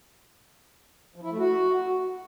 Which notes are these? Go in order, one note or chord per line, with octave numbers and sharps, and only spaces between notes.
F3
E4
A3
F#4